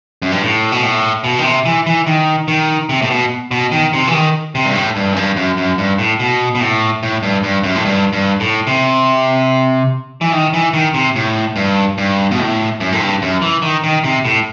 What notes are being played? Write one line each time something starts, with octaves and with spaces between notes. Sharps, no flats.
F#2
G2
A2
B2
A2
B2
D#3
C3
E3
E3
D#3
D#3
C3
A2
B2
B2
D#3
C3
E3
D#3
C3
G2
A2
G2
F#2
G2
F#2
F#2
G2
A2
B2
B2
A2
A2
G2
G2
F#2
A2
G2
G2
A2
C3
E3
D#3
E3
D#3
C3
A2
G2
G2
B2
A2
F#2
A2
G2
F#2
E3
D#3
D#3
C3
A2